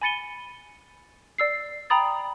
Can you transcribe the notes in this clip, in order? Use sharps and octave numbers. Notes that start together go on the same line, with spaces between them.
G#5 B5 A6 C#7 D#7 G7
D5 E6 C7
G5 A#5 B5 D#6 A6